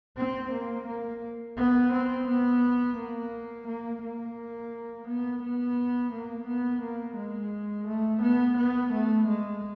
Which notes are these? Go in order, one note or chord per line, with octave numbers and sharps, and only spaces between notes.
C4
A#3
A#3
B3
C4
B3
A#3
A#3
A#3
B3
B3
A#3
B3
A#3
G#3
A3
B3
B3
A3
G#3